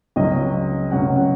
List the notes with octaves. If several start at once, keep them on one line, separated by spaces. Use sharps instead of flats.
C#2 C#3 F#3 C#4 D#5
C#2 C#3 F#3 C#4 F#5
F#5